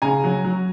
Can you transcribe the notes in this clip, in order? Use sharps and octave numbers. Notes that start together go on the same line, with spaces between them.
C#3 G#5 A#5
F#3
F#3